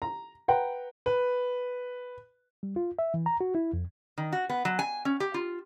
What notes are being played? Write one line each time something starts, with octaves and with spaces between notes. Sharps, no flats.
A#5
B4 F#5 G5 A#5
B4
G3
F4
E5
E3
A#5
F#4
E4
F2
D#3
F#4
B3
F#3
G#5
C#4
G4
F4